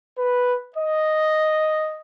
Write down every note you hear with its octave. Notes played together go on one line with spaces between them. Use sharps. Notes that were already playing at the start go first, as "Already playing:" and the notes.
B4
D#5